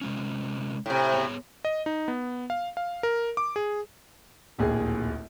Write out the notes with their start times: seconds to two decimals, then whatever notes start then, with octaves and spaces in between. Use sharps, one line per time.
0.01 C3 G#3 C#4
0.86 A2 C3
1.14 B3 G#4 C#5
1.65 D#5
1.86 D#4
2.08 B3
2.50 F5
2.77 F5
3.03 A#4
3.37 D6
3.56 G#4
4.58 D1 A#1 D#2 G#4